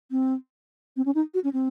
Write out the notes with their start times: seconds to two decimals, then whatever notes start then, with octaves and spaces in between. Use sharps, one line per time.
0.11 C4
0.97 C4
1.06 C#4
1.15 D#4
1.34 F#4
1.44 C#4
1.53 C4